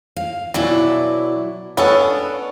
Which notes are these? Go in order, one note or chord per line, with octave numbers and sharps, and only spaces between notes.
F5
B2 E3 F#3 D4 E4
B3 C#4 D4 A4 C#5 D#5